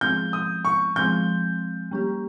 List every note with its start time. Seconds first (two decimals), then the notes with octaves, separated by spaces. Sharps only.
0.01 F3 G#3 C4 G6
0.33 D#6
0.65 C#6
0.96 F3 G#3 C4 G6
1.91 G3 A#3 C#4 G4